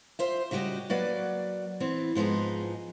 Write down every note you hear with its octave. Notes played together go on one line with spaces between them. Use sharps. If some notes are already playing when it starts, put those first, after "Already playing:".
F4 C5 E5
C#3 G3 F#4 G4 D#5
F#3 A#3 B4 D5 F#5
E3 B3 C4
G#2 F3 B3 D#4 G#4